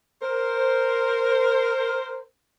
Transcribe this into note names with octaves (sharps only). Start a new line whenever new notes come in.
A#4 C5